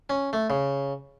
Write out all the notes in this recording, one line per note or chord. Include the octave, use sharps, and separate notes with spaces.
C#4
A3
C#3